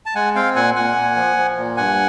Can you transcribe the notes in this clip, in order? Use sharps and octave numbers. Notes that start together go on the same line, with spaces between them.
A5
G#3 F#5 G#5
C4 F5 G5
A#2 F#5 G#5
A#2 F#5 G#5
A#2
F3
F3
A#2
G2 F#5 G#5